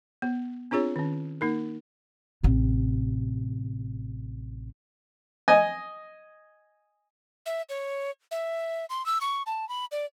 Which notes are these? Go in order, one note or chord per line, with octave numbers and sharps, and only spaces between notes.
B3
C4 D4 F4 G#4 C#5
D#3 C#4
A#3 D#4 A#4
A1 C3
D#5 G#5
E5
C#5
E5
C6
E6
C#6
A5
B5
D5